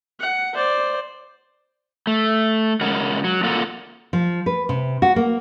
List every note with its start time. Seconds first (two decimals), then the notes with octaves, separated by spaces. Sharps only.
0.20 F#5
0.54 C5 D5
2.07 A3
2.81 C#3 G#3 A#4 F#5
3.24 F#3
3.43 A#3 F4 A4 A#4 F#5
4.13 F3
4.46 B4
4.69 C3
5.02 F#4
5.16 A#3